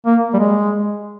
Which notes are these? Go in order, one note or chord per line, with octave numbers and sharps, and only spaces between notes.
A#3
G3
G#3